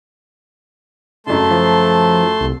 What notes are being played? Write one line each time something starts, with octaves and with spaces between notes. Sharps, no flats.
F#2 C#3 A3 A5 C6
F3
C2